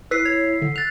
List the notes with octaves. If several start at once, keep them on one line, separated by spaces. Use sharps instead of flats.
E4 B4 E6 B6 C7
C#5
D3
F#6 A6 F7